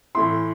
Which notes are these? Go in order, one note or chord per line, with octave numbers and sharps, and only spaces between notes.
A2 E3 A3 E4 C6